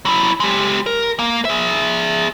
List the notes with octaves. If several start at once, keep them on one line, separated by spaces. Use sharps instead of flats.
F#3 E4
G#3 G4
A#4
A#3
G#4 E5